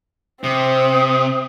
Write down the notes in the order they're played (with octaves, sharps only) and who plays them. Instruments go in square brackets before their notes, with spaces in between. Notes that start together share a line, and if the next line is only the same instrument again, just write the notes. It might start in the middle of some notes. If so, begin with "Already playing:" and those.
[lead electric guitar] C3 [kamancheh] C4 [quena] D#6